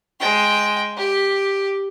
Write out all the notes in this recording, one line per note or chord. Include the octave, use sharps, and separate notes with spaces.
G#3 G5
G4